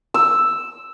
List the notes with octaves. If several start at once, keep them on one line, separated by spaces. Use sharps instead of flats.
E6